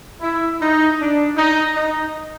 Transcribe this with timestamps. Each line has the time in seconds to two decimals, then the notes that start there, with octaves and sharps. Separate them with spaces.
0.21 E4
0.60 D#4
0.99 D4
1.36 D#4
1.75 D#4